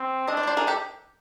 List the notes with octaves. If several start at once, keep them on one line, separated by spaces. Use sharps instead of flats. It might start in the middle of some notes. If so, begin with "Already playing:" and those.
Already playing: C4
D4 C#5 D#5
C5 D5
C#5
C5 D5
G#4 A#4
G4 A4